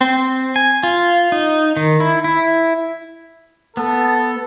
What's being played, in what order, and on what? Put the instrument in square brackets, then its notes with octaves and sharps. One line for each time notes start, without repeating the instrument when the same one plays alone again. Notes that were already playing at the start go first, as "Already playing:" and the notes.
[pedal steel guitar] C4
G#5
F4
D#4
D#3
E4
E4
[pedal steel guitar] B3 [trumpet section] A4